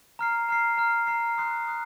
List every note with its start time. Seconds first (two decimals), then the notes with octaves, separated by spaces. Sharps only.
0.19 A#5 F6 C7
0.49 A#5 F6 C7
0.78 A#5 F6 C7
1.07 A#5 F6 C7
1.38 C6 D#6 F#6 C7
1.66 C6 D#6 F#6 C7